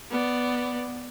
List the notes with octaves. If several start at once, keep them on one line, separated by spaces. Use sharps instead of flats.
B3 D5